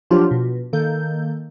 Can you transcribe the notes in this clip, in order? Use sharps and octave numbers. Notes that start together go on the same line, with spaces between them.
F3 F#3 D4 F4 G4
B2
D#3 A#3 A4 G6